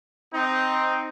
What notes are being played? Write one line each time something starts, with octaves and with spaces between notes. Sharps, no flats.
C4 D#4